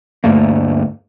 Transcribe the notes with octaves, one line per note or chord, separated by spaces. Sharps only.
D2 G2 A3 A#3